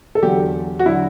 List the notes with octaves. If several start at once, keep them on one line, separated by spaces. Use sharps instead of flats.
A4
E2 D3 F#3 G4
F#4
D3 F#3 E4